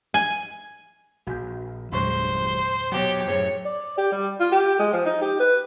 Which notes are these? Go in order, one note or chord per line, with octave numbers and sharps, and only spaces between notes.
G#5
A#1 F#4 G#5 G6
G1 E2 A#2 F#3 G#3 C5 C#6
B2 F#3 G4 C#5
F#2 A2 G#4 C5 C#5
D5
G4
G3
F4
G4
G#3
F3
D#4
G4
B4